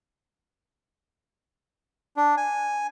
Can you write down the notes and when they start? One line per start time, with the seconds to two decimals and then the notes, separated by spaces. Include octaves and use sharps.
2.17 D4
2.37 G#5